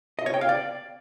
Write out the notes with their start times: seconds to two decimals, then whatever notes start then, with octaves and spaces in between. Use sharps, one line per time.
0.19 D#5
0.26 C#5
0.34 G5
0.41 F5
0.49 D5